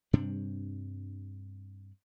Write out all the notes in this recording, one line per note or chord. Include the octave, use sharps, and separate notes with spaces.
G2 C3 G3 D4